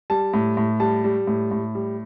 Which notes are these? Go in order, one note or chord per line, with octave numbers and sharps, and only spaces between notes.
G3 A5
A2
A2
G3 A5
G3
A2
A2
G3